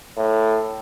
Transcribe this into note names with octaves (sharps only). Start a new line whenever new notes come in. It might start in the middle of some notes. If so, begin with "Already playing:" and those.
A2